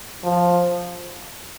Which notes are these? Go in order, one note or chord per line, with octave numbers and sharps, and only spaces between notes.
F3